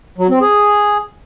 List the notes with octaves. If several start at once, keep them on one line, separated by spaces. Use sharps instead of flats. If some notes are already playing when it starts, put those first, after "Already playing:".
F#3
C4
G#4